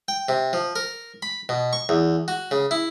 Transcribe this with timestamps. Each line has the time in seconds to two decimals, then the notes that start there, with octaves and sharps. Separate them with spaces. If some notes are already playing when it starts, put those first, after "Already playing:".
0.08 G5
0.29 C3
0.53 F3
0.76 A#4
1.22 B5
1.49 B2
1.73 C#6
1.89 E2
2.28 F#4
2.51 C#3
2.71 E4